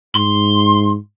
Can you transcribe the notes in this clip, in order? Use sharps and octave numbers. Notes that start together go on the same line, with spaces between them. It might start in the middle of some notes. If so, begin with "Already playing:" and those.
G#2 C6